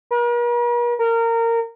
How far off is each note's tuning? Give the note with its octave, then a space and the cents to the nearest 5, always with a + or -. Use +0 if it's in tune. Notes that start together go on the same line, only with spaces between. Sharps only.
A#4 +45
A#4 -20